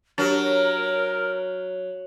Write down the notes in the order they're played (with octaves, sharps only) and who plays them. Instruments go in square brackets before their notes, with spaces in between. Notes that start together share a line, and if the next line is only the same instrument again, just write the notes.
[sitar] F#3 [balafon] D4 G4 [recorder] A#4